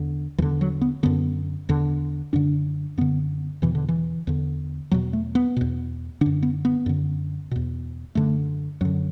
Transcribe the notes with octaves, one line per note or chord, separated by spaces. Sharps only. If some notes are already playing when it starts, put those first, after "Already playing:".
Already playing: E2 D3
E2 D3 E3
F#3
B3
F#2 D3 B3
E2 D3
F#2 D3 D4
F#2 D3 B3
E2 B2 E3
D3
E3
E2 D3
E2 B2 F#3
A3
B3
E2 B2
F#2 D3 D4
B3
B3
F#2 D3
E2 B2
F#2 D3 A3
F#2 D3 F#3